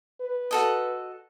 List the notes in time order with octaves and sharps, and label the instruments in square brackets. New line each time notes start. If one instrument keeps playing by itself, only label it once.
[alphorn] B4
[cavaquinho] F#4 A4 D#5